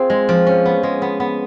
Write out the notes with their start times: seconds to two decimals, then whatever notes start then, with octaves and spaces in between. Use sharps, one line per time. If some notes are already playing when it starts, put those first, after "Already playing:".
Already playing: C4 F4 G#4
0.10 G#3
0.29 F3
0.47 C#4
0.65 B3
0.83 G#3
1.02 B3
1.20 B3